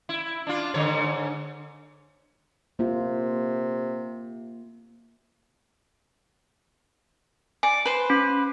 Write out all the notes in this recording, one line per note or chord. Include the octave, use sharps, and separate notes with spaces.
E4
D4 F4
G#2 D3 C#5
C3 A#3 F4
D5 G#5 D7
B4 C5
C#4